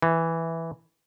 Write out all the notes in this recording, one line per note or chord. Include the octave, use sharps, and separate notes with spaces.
E3